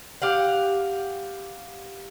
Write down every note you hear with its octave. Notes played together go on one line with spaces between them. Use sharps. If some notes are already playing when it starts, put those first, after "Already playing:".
G4 F5 F#5